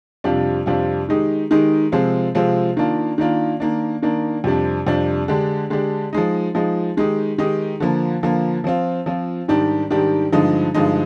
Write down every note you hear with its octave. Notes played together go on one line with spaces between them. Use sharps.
F2 C3 G3 D4 F4
F2 C3 G3 D4 F4
D#3 G#3 D#4 G4
D#3 G#3 D#4 G4
C3 F3 G#3 C4 F4
C3 F3 G#3 C4 F4
D#3 A#3 D4 F4
D#3 A#3 D4 F4
D#3 A#3 D4
D#3 A#3 D4
F2 C3 G3 D4
F2 C3 G3 D4
D3 G#3 D4 G4
D3 G#3 D4 G4
F3 G#3 D#4
F3 G#3 D#4
D#3 G#3 D#4 G4
D#3 G#3 D#4 G4
D3 F3 A#3
D3 F3 A#3
F3 C4 F4
F3 C4 F4
G#2 D#3 G3 D4 G4
G#2 D#3 G3 D4 G4
G2 D3 F3 G#3 D#4
G2 D3 F3 G#3 D#4